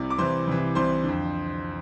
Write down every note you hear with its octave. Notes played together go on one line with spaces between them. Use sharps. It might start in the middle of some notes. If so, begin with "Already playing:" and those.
Already playing: C2 C3 D6
D6
C2 C3 E3 C5 C6
C2 C3 E3
C2 C3 E3 C5 C6
D3
F2